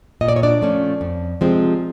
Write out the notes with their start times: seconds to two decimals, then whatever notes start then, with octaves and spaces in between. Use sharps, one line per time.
0.21 A#2 D#5
0.28 D5
0.36 C#5
0.43 D4 D5
0.61 F3 A3 C#4
1.01 F2
1.41 C3 F3 G#3 C4